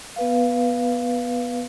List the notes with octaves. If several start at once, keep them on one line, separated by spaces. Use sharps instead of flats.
B3 B4 F5